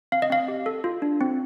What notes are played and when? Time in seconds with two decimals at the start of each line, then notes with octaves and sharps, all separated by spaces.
0.12 C4 F5
0.22 D#5
0.30 C4 F5
0.48 G4
0.66 A4
0.84 F4
1.02 D4
1.21 C4